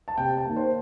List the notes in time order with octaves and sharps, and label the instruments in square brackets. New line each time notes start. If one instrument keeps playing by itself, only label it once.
[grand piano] A5
C3 G5
A5
D#3 A#3
C5